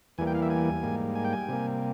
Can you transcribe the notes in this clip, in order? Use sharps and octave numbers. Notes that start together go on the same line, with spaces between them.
E2 E3 G3 A#3 G#5
G5
F5
E5
G#5
G#2 G3 A#3
G#5
G5
G#5
C3 G3 A#3